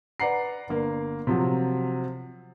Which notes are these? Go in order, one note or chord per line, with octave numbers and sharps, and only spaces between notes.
B4 D5 F#5 A#5 C7
G1 A#3
C3 F3 F#3